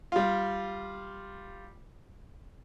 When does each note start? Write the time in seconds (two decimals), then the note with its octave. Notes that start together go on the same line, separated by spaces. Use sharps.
0.12 G3 F4